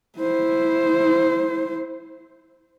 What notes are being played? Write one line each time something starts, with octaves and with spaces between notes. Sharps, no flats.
E4 C5